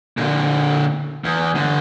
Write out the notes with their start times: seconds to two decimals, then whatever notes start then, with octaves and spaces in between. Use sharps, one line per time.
0.17 A#2 D3
1.24 E2
1.55 G2 D3